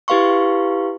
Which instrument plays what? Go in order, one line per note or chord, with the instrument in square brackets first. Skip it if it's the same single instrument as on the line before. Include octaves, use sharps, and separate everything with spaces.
[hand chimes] E4 G4 B4 F5 C6 C#6